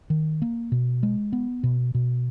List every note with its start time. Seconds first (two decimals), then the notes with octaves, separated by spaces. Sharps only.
0.10 D#3
0.42 A#3
0.72 B2
1.03 G#3
1.33 B3
1.63 B2
1.95 B2